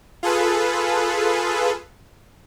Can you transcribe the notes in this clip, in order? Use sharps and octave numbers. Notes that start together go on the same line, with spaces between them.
F4 G#4 A4 B4